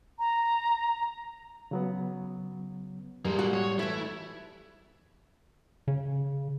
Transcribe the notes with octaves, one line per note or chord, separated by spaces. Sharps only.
A#5
C#3 F#3 B3
A2 G3 G#3 A#3
F#4
C#5
E3 A3 E4
C#3